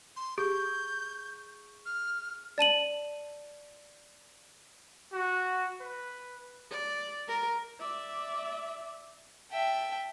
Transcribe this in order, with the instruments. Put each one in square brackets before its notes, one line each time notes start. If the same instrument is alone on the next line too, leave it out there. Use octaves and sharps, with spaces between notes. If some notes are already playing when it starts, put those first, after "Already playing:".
[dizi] C6
[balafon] G4 [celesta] G#4 C#6 [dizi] G6
[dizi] F6
[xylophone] D5 A5 D#7 F#7
[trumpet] F#4
B4
[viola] D5
A#4
D5 E5
[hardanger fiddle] E5 G5 [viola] A5